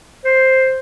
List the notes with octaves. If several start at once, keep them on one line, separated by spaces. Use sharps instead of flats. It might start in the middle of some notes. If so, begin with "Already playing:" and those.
C5